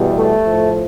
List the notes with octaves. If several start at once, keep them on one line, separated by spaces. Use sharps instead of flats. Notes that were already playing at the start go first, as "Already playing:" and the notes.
Already playing: E2 B2 G3
A3
A2 F3